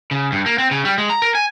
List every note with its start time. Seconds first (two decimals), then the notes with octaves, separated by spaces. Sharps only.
0.11 C#3
0.32 G2
0.46 A#3
0.58 C4
0.71 C#3
0.85 G3
0.98 G#3
1.10 A#5
1.22 A#4
1.35 G#5